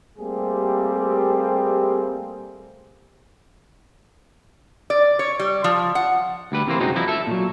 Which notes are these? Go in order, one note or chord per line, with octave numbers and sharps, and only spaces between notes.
G3 A3 A#3 C4 G4 G#4
D5
C#5
G3
F3
F#5
D2 G3 B4
C3 E3 A#3 C4
F#2 F#3 G#3 C4 D#4
F3 G3 D#4 E4
A4 E5
A#2 F#3